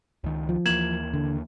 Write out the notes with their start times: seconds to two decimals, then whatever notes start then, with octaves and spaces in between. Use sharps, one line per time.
0.24 C#2 D#3
0.49 F3
0.66 D#2 E3 A#3 G#6 E7 F#7
1.14 D3